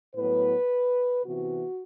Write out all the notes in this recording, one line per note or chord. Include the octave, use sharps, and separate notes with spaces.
A2 F#3 B3 B4
C3 E3 B3 F#4